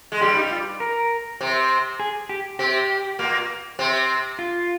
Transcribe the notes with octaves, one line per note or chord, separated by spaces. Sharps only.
G#3
G2 G3 G4
D#4
F4
A#4
C3 C4
G#4
G4
C3 C4 G4
A#2 A#3
C3 C4
F4